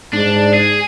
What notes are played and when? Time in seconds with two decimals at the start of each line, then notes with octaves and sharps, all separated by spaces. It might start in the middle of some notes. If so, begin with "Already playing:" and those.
0.13 G#2 D4
0.54 G#4